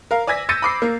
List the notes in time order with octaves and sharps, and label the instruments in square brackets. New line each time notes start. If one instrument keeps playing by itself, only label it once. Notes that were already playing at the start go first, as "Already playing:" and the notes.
[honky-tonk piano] A#4 F5
D5 G#5 E6 G#6 A#6 B6
E6 G6 A6 A#6 C#7 D#7
B5 D6 C7
A#3 A#4